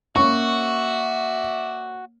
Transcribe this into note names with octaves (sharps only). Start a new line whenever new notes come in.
A#3 C#4 F#4 C#5 D5 E5 C#6